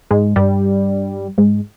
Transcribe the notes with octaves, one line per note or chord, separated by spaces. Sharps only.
G#2 G#3
G2 G3
G#2 G#3